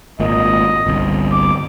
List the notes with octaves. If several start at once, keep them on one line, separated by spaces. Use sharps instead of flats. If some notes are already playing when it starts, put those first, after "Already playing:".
G#1 A#2 D#5
G1 C2
D6